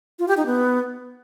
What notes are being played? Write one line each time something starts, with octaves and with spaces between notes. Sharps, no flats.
F4
G4
D#4
B3